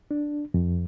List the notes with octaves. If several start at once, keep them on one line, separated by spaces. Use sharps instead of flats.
D4
F2